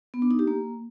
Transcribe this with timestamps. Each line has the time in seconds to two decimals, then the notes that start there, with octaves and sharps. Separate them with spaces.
0.14 B3
0.22 D4
0.31 D#4
0.39 G4
0.47 A#3